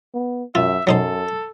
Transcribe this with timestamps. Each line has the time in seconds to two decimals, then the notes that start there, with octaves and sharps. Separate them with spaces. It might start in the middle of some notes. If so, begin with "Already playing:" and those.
0.14 B3
0.55 F#2 F4 E5
0.87 F#2 F#3 D#4 A4 C5